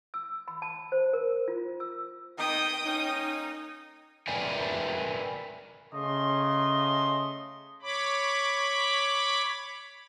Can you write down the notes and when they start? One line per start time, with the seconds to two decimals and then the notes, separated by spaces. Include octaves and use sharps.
0.14 E6
0.48 B5
0.62 A5
0.92 C5
1.13 A#4
1.48 F4
1.80 E6
2.38 D#3 D#5 G5 D#6
2.85 A#3 C#4 D#4
4.28 A#4 B4 D5 E5 G5 G#5
5.94 C#3 A3 D#5 C6
7.82 C#5 B5 D6